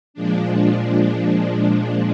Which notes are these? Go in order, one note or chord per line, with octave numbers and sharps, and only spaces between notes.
A#2 F3 G#3 D4